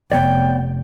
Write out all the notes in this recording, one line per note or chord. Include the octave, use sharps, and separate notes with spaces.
F1 B3 C#5 D5 G5